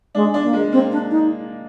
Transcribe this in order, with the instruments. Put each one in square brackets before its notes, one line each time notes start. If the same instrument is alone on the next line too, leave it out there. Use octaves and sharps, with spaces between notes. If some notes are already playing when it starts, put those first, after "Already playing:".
[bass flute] G#3 [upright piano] D4
[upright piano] D4
[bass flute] A#3
[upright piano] G#3
[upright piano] A#3 [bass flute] C4
[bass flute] D4
D#4